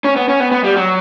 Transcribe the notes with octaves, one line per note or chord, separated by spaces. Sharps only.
C#4
B3
C#4
B3
B3
G3
F#3